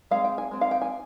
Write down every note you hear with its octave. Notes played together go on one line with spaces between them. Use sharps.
G#3 C4 F5
G5
G#5
G#3 C4
F5
G5
G#5